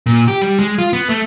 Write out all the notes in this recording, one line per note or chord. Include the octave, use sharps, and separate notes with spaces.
A#2
G4
G3
G#3
F4
B3
A3